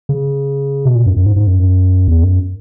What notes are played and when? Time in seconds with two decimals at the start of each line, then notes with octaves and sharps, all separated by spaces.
0.09 C#3
0.85 B2
0.95 A#2
1.06 F#2
1.16 F#2
1.26 G#2
1.36 G#2
1.47 F#2
2.08 E2
2.23 F#2